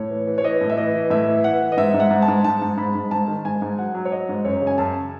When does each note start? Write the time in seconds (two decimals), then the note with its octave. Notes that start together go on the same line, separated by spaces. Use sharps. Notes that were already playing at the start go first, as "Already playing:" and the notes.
Already playing: A2 C#5
0.10 E3
0.27 E3
0.38 C#5
0.44 E3 D#5
0.61 A2
0.70 E5
0.77 E3 D#5
0.94 E3
1.10 A2 E5
1.28 E3
1.44 E3 F#5
1.61 E3
1.72 D#5
1.77 G#2 E5
1.94 G#2
2.00 F#5
2.11 G#2
2.22 A5
2.28 G#2
2.44 G#2 A5
2.62 G#2
2.77 G#2 B5
2.95 G#2
3.11 G#2 A5
3.28 D#3
3.45 G#2 G#5
3.62 G#2
3.78 F#3 F#5
3.95 F#3
4.05 C#5
4.11 F#3 D#5
4.29 G#2
4.45 F#2 C#5
4.62 C#3
4.67 G#5
4.78 F#2 A5